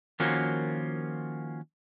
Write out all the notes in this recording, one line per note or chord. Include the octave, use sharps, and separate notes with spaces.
D#3 F3 A#3 C#4 F4 F#4